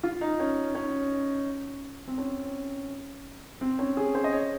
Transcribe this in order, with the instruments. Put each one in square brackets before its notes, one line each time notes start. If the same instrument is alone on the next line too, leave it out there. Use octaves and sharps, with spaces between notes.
[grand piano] F4
D#4
C#4
C#4
C4
C#4
C4
C#4
G#4
C5
D#5
C#5